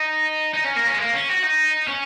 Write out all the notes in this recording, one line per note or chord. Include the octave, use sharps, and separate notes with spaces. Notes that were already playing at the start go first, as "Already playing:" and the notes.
Already playing: D#4
D#4
C#4
A#3
C#4
G#3
A#3
C#4
F#4
D#4
C#4